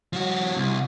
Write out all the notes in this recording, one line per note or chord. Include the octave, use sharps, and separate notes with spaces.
F3 F#4
C2